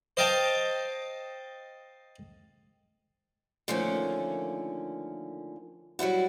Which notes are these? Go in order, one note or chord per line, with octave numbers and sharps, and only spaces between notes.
C5 D#5 F5 G5 A5
D3 D#3 F3 A3 A#3 C#4
F#3 G3 E4 F#4